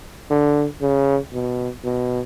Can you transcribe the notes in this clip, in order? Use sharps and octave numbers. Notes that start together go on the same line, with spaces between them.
D3
C#3
B2
B2